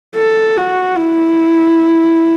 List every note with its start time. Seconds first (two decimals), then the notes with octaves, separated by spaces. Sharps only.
0.15 A4
0.57 F#4
0.98 E4